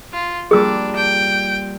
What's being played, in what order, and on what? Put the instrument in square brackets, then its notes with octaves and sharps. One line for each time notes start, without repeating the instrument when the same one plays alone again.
[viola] F4
[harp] G3 A#3 F4 [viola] D4 [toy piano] G#4 E6
[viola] G5